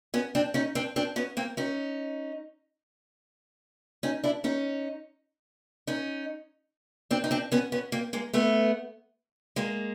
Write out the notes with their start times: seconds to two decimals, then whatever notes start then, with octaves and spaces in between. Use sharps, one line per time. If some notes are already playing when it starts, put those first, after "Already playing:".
0.14 B3 C#4
0.35 C4 D4
0.54 C#4 D#4
0.75 C4 D4
0.96 C4 D4
1.16 B3 C#4
1.37 A#3 C4
1.57 C#4 D#4
4.03 C#4 D#4
4.24 D4 E4
4.44 C#4 D#4
5.87 C#4 D#4
7.11 C4 D4
7.24 D#4
7.31 C4 D4
7.52 B3 C#4
7.72 B3 C#4
7.92 A#3 C4
8.13 G#3 A#3
8.33 A3 B3
9.56 G#3 A#3